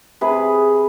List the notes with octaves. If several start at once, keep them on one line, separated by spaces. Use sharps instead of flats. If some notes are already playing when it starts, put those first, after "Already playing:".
C3 G#4 B4